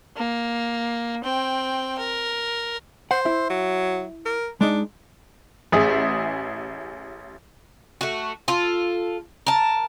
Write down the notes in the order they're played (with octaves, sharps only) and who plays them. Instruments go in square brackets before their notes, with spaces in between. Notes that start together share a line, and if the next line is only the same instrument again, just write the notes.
[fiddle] A#3
C4 G5
A#4
[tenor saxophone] C5 [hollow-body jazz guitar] F#5
[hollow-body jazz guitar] E4 E5
[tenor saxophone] F#3
A#4
[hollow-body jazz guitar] G#3 D#4 [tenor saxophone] D4
[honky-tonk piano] A1 G#4 E5
[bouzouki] A3 F#4
F4 A4
A#4 A5